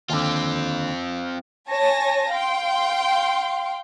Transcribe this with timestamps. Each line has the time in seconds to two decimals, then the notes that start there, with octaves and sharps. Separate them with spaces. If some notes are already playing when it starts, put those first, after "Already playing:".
0.10 D#2 D3 C4 F4
1.67 C#5 G#5 A5 A#6
2.31 F5 G5 C6